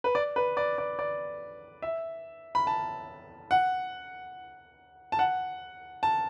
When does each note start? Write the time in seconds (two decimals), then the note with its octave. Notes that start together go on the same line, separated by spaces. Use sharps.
0.04 B4
0.15 D5
0.36 B4
0.57 D5
0.78 D5
0.99 D5
1.82 E5
2.55 B5
2.67 A5
3.51 F#5
5.12 A5
5.19 F#5
6.03 A5